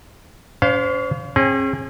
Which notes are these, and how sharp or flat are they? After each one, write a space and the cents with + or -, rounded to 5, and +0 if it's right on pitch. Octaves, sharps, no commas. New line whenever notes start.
C#4 +40 C5 -20 F5 +0
C#4 -45 G#4 -10 G5 +0